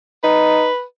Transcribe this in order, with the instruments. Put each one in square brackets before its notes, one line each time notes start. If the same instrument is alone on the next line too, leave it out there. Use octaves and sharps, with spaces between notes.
[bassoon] D#4 [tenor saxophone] B4